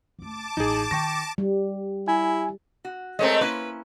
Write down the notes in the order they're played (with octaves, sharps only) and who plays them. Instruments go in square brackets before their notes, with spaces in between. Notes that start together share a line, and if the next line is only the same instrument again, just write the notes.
[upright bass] F#1 A3 [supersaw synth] A5 D6
[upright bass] A1 [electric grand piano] D#4 G#4
[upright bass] D#3 [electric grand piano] G5 C#6 A#6
[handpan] G3
[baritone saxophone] E4 [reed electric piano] G#5
[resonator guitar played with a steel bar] F#4
[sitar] G#3 A3 C4 [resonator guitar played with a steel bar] A#4 C#5 D#5
[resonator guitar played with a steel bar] A#3 C#4 E4 [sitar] B4